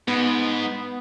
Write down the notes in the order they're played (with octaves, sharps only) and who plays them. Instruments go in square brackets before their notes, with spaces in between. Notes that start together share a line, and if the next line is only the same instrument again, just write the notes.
[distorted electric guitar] G#2 [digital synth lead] B3